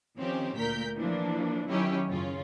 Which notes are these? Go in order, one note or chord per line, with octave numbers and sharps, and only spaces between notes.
D#3 F3 C4 C#4 G4
D2 A#2 A#4 G6 B6
E3 F3 A#3 D4
D#3 F#3 C#4 E4 G4 C#5
F#2 C#3 C#4 F4